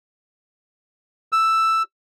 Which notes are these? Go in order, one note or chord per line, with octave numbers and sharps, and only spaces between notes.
E6